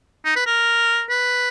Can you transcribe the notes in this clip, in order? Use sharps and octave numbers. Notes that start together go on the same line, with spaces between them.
D#4
B4
A#4
B4